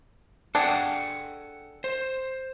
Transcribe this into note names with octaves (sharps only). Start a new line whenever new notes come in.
D4 G#4 A4 F#5 G5
C5